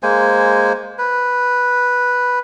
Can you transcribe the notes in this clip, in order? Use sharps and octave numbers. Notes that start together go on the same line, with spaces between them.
G#3 A#3 C5 G#5
B4